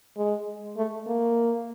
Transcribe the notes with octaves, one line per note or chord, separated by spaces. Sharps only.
G#3
A3
A#3